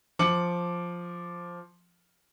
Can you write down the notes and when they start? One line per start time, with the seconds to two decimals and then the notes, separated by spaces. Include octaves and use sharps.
0.19 F3 D6 C#7 F#7